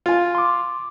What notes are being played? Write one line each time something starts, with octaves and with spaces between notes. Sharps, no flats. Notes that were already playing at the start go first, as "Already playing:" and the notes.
F4 G#5
C6 D6